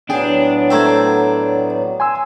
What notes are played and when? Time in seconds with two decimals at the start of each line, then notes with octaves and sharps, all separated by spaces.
0.10 A2 F#3 B3 D4 G#4 G5
0.70 A3 C5 E5 G5 A#5 G#6
2.00 G#5 C6 E6